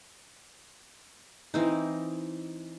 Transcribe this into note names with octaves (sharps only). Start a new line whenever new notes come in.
E3 C4 D#4